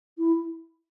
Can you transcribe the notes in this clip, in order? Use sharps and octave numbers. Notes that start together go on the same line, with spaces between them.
E4